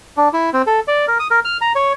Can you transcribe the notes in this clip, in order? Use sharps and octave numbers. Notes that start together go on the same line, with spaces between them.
D4
E4
C4
A4
D5
A#4
D#6
A#4
F6
A#5
C#5